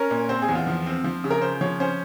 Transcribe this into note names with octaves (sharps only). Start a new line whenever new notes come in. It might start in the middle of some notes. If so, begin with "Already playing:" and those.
Already playing: C#4 A#4
A#2
C4 C5
G#4
E2
F4
F3
C4
F3
C#3
A#4
C#3 C5
F3 C#5
C#4 C5